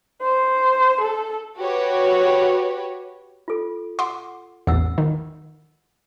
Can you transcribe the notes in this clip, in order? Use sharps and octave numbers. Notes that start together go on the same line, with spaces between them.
C5
A4
F#4 G4 B4 C#5
F4 A4
F#5 C6 D6
A1 E2 F#5 E6
D#3